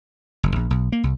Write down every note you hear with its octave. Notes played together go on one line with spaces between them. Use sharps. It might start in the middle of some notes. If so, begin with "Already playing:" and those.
F#1
A#1
B1
A#3
C2